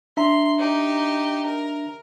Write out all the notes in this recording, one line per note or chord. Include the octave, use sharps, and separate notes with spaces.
D4 E5 A#5 C6
D#4 G4
A#4